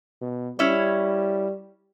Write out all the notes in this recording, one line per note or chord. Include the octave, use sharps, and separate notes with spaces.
B2
G3 C#4 E4 C#5